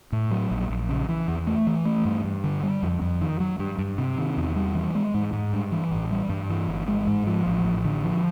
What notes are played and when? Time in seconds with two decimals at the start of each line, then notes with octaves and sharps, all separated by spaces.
0.12 A2
0.31 F#3
0.51 A#1
0.70 A#1
0.89 C#3
1.09 E3
1.28 E2
1.47 A3
1.67 E3
1.85 A3
2.05 G2
2.24 G2
2.44 D3
2.63 G3
2.83 F2
3.01 F2
3.21 D#3
3.40 F#3
3.59 G2
3.79 G2
3.98 C3
4.18 D#3
4.37 E2
4.56 G3
4.75 E3
4.95 G#3
5.14 G#2
5.33 G#2
5.53 G2
5.72 E3
5.91 A1
6.11 G3
6.29 G2
6.50 E3
6.68 G1
6.88 G#3
7.07 G#2
7.27 F3
7.46 A1
7.64 A1
7.85 D3
8.04 F3